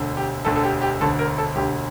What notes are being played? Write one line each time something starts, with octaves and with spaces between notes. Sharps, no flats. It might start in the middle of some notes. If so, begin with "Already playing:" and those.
Already playing: E1 D2 D3
G4
E1 D2 D3 A4
A4
G4
G4
E1 D2 D3 A4
A#4
A4
E1 D2 D3 G4